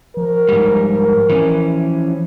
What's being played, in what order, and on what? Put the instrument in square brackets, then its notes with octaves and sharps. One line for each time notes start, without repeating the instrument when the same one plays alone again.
[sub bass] F3 [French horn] A#4
[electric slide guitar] G#2 G3
E3 C#4